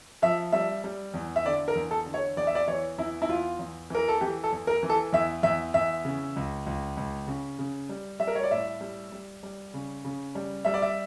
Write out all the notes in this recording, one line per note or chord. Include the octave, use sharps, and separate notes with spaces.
F3 E5
G3 E5
G3
E2
E5
D3 D5
A#4
E2
A4
D3
C#5
E2 D5
E5
D5
E3 C#5
E2 E4
E4
E2 F4
E2
E3 A#4
A4
E3 G4
A4
E2
A#4
E3
A4
E2 E5
E2 E5
E2 E5
C#3
C#2
C#2
C#2
C#3
C#3
G3
G3 E5
A#4
C#5
D5
A2 E5
G3
G3
G3
C#3
C#3
G3
G3 E5
D5
E5